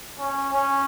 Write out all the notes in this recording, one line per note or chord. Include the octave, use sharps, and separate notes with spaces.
C#4
C#4